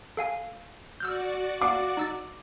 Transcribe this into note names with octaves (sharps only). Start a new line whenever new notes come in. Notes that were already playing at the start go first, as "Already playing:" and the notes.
A4 F5 G#5
F#4 D5 E6 F6 G6
F5 F#5 D6
D#4 E6 A6